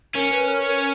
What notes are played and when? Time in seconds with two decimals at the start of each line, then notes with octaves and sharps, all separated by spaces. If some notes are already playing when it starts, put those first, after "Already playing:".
0.15 C#4 A#4
0.32 B4
0.48 A#4
0.65 A#4